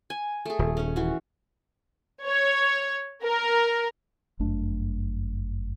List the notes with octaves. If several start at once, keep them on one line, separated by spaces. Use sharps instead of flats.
G#5
A3 G#4
D#1
C#4 D#4
E3 F#4
C#5
A#4
G1 F#2 A3 D4